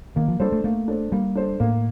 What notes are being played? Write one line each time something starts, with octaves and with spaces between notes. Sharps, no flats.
D#3 A#3
F3
G3 D4 A4 C5
A3
A3 A#3
D4 A4 C5
G3 A#3
D4 A4 C5
A2 A#3